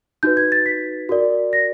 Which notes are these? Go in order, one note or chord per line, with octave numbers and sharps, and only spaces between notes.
D#4 F#4 B4 G6
G#6
A6
B6
F#4 A#4 D5
A#6